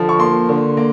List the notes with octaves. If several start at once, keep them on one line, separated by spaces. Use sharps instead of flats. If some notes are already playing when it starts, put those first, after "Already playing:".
Already playing: D3 F3
C#6
A#3 C6
D3
A#3